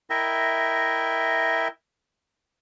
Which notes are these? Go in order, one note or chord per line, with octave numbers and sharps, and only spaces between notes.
E4 A#4 D#5 E5 G5